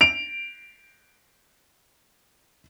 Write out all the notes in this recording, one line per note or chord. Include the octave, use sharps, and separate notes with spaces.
D7 F7